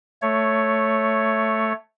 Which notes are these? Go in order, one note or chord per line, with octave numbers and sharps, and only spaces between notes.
A3 C#5